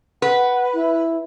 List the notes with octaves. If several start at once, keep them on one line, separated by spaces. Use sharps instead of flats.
B4 F#5
E4